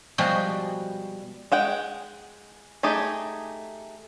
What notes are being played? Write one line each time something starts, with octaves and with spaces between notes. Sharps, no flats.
B2 F3 G3 G#3 F#4 G#4
G#3 F#5 G5
A3 D#4 G4 G#4